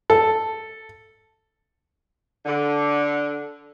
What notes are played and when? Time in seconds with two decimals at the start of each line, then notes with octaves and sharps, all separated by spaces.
0.10 A4
2.45 D3